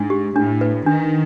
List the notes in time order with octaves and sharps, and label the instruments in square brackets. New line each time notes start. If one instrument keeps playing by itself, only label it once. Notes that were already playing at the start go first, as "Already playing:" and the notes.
Already playing: [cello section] G#2 [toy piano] D4
[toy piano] G4
[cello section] A2 [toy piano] D4
[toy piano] B4
[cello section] D#3 [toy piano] D4